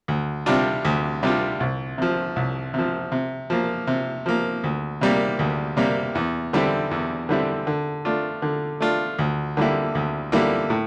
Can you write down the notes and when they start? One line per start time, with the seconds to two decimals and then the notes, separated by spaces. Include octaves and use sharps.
0.08 D2
0.46 C3 G3 D4 F4
0.85 D2
1.23 C3 G3 D4 F4
1.60 C2
1.98 C3 F3
2.36 C2
2.74 C3 F3
3.12 C3
3.50 F3 A#3
3.87 C3
4.26 F3 A#3
4.64 D2
5.01 C3 G3 A#3
5.39 D2
5.77 C3 G3 A#3
6.15 E2
6.53 D3 G3 C4 E4
6.91 E2
7.29 D3 G3 C4 E4
7.67 D3
8.05 A3 D4 F4
8.42 D3
8.80 A3 D4 F4
9.19 D2
9.57 D3 G3 A#3 E4
9.95 D2
10.32 D3 G3 A#3 E4
10.70 A2